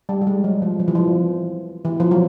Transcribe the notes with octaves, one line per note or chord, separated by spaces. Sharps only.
G3
G3
G#3
F#3
F3
F3
E3
F3
E3
F3
F#3